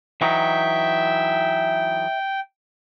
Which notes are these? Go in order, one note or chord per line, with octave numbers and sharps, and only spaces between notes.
E3 F#3 D#4 E5 G5